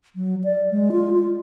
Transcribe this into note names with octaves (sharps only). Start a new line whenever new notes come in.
F#3
D5
G#3
F4
F4